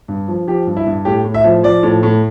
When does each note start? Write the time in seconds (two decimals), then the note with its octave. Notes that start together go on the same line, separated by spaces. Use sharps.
0.08 G2
0.28 F3
0.48 F3 G4
0.67 G2
0.77 E4
0.87 G2
1.05 A2 G4
1.25 A2
1.34 E5
1.44 F3
1.63 F3 D5
1.83 A2
2.03 A2